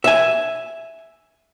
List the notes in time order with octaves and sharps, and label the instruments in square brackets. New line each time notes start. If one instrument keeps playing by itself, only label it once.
[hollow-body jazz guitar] E5 G#5